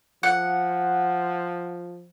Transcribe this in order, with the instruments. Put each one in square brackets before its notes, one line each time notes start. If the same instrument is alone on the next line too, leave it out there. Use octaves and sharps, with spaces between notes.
[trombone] F3 [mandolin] F#5